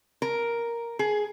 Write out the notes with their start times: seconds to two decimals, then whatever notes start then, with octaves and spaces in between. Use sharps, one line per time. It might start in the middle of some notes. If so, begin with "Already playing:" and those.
0.22 A#4
0.99 G#4